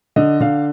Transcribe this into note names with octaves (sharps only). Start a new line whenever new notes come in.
D3 D#5
D3 F5